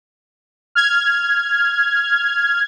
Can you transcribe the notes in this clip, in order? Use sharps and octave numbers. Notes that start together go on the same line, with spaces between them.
F6 G#6